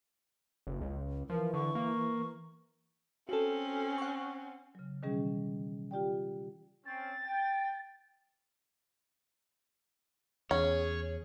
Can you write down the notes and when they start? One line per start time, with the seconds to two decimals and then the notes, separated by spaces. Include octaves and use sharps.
0.67 F#1
0.81 C#2
1.30 E3 F3 A#4
1.54 D3 C#6
1.75 A#3
3.29 C4 C#4 F#4 A4
3.98 F#5 C#6
4.75 C#3 F#3
5.02 B2 D#3 E3 G3 C#4 G#4
5.91 F4 G4 D5 G5
6.86 C4 C#4 A6
7.25 G5
10.51 E2 C#4 G#4 C#5